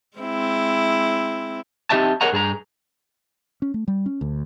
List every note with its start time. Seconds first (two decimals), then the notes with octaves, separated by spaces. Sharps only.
0.17 G#3 C4 E4
1.90 C4 D#4 G4 D#5 E5 A5
2.21 G#4 A#4 C#5 D#5 F#5 A#5
2.32 G2 G#4 A5 A#5
3.62 C#4
3.74 A3
3.88 G3
4.06 C#4
4.21 D2